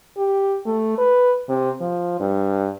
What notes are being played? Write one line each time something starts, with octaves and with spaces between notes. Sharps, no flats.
G4
A3
B4
C3
F3
G2